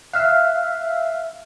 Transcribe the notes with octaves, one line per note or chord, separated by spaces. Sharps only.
E5 F5 F6 F#6